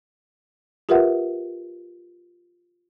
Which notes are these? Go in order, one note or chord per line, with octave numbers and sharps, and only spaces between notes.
F4 G4 A#4 B4 E5 F#5